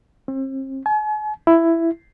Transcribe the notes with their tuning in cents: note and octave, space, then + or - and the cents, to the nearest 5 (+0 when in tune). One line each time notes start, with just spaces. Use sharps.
C4 +40
G#5 +45
E4 +10